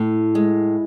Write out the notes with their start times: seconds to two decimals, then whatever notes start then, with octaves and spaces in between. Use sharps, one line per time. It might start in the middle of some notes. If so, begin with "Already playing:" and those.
Already playing: A2
0.35 G#3